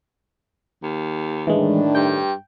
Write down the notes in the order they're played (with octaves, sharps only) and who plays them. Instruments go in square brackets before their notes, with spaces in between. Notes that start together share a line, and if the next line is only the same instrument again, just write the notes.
[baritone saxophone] D#2
[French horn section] A2 D#3 D4 [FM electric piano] E3 G#3
[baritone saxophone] G2 [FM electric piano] G5